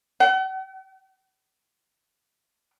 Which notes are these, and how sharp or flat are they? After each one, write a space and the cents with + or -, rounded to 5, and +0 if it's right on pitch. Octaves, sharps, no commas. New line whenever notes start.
F#5 +45